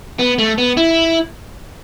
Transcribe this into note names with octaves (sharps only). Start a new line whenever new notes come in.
B3
A3
B3
E4